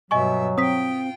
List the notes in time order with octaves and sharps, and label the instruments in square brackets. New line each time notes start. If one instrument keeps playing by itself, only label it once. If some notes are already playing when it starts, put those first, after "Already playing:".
[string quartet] G2 B2 E5 [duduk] F#3 [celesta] D#5 G#5 C#6
[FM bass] C4 [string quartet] F4 G5 [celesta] D#6 B6